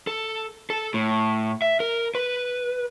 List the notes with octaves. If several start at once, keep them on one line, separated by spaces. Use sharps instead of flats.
A4
A4
A2
E5
A#4
B4